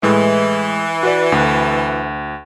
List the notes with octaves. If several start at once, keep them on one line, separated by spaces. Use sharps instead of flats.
A2 E3 G#3
F#4 B4 D5
D2